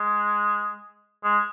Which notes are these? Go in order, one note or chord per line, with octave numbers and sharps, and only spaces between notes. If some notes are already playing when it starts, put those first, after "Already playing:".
Already playing: G#3
G#3